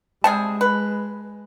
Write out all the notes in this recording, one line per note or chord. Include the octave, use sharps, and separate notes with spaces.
C3 G3 G#3 G#4 A5
B4